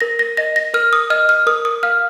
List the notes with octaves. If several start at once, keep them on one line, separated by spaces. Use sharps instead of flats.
A#4 A#6
A#6
D#5 A#6
A#6
A#4 F6
D#6
D#5 F6
F6
A#4 D#6
D#6
F5 F6